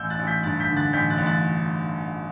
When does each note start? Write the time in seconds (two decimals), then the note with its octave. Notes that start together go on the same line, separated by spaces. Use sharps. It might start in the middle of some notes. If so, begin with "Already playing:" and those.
Already playing: A1 E6 G6
0.10 F#6 A6
0.19 A1
0.27 G6 B6
0.43 G2 F#6 A6
0.60 G6 B6
0.69 D3
0.77 F#6 A6
0.93 A1 G6 B6
1.10 F#6 A6
1.18 A1
1.26 F#6 A6